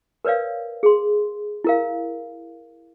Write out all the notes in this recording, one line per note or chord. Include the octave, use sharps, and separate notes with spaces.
A#4 B4 C#5 D5 F5
G#4 C6
E4 A#4 F5